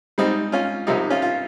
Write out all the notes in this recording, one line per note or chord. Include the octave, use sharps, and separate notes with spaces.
G#2 G3 C4 D#4
C#4 F4
C2 C3 F3 D#4 G4
C#4 F4
F4